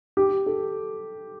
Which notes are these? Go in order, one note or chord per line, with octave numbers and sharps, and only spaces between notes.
G4
A4